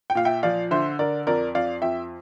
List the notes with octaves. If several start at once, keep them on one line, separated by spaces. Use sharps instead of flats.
G5
A#2 F5
E5 G5
F3 D5 F5
D3 C5 E5
D3 A#4 D5
F2 A#4 D5
F2 D5 F5
F2 E5 G5